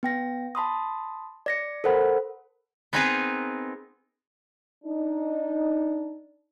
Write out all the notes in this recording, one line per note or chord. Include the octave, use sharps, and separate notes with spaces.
B3 G5 A#6
A5 B5 C6 D#6
D5 A#6 C#7
A4 A#4 C5 F#5 B5
B3 C4 D#4 G#4 A#4 B4
D4 D#4